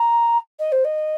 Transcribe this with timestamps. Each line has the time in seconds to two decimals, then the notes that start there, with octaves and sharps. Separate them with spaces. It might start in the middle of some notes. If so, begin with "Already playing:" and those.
Already playing: A#5
0.59 D#5
0.72 C5
0.84 D#5